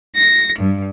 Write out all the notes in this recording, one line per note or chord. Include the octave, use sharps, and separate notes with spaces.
A#6
G2